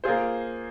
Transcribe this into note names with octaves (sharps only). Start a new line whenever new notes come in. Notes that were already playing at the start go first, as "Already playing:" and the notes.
A#3 F4 G#4 C5